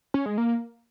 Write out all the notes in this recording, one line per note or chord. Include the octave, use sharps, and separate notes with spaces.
C#4
G#3
A#3